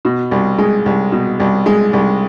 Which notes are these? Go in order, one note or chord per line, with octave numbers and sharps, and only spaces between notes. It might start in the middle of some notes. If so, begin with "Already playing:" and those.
B2
C2
G#3
C2
B2
C2
G#3
C2